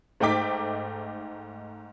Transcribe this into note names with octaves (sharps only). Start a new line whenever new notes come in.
G#2 A3 D#4 G5 D6 B6